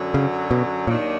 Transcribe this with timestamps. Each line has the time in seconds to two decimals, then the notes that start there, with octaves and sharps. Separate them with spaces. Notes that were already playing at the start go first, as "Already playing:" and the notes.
Already playing: F#2 D3 F#3
0.14 C#3
0.51 B2
0.87 D#2 A#2 D#3 F#3 A#3 D4